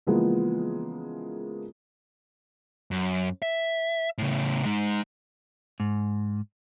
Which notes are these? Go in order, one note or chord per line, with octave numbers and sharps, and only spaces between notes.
C#3 E3 F3 G#3 A#3 B3
F#2
E5
A2 C#3
G#3 D#4
G#2